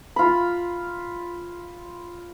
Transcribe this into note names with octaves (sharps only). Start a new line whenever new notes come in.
F4 B5